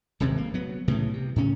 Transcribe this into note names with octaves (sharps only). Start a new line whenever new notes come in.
D#1 G#1 G2 C3
A#3
F#3 B3
C2 A2 C#3 E3
C3
A2 C#3 C#4